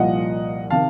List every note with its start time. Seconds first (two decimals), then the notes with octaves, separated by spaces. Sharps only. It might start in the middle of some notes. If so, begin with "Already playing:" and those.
Already playing: C2 A#2 F3 D#5 F#5
0.70 C3 D#3 F5 A5